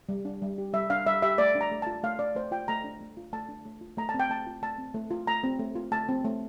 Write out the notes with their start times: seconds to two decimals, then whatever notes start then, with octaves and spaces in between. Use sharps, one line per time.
0.09 G3
0.25 D4
0.42 G3
0.58 G4
0.73 G3 E5
0.90 D4 F5
1.06 G3 E5
1.22 G4 E5
1.38 A3 D5
1.55 D4
1.61 A#5
1.71 A3
1.82 F4 A5
2.03 A3 F5
2.19 D4 D5
2.35 A3 C5
2.51 F4 G5
2.68 A3 A#5
2.84 D4
3.00 A3
3.17 F4
3.33 A3 A5
3.49 D4
3.65 A3
3.81 F4
3.97 A3 A#5
4.09 A5
4.14 C4
4.20 G5
4.30 A3 A5
4.47 F4
4.62 A3 A5
4.78 C4
4.94 A3
5.11 F4
5.27 A3 A#5
5.44 C4
5.59 A3
5.75 F4
5.92 A3 A5
6.09 C4
6.25 A3